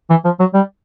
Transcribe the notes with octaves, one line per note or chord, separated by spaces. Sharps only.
E3
F3
F#3
G3